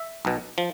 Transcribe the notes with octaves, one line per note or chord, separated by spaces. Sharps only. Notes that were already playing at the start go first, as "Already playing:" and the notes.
Already playing: E5
B1 B2
F3